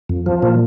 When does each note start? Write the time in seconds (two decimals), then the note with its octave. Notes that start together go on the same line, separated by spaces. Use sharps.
0.09 F2
0.26 F3
0.42 A#2